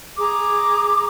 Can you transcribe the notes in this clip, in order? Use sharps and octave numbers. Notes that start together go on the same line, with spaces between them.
G#4 A#5 D6